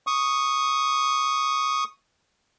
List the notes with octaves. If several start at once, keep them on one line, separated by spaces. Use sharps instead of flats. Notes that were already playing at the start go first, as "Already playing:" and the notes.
C#6 D#6